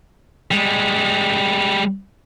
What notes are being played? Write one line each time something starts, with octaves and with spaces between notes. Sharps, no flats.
G3 G#3